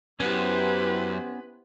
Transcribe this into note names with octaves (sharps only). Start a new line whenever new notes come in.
F#2 B3 C#4 E4 G4 B4 C5